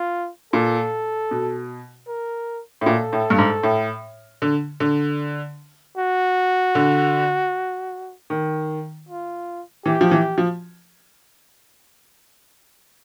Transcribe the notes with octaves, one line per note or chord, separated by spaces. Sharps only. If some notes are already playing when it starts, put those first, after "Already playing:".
Already playing: F4
A#2 A4
B2
A#4
A2
A#2 A4
A2
G2
G#2
A2
D3
D3
F#4
D3
D#3
F4
E3 G4
F3
E3
F3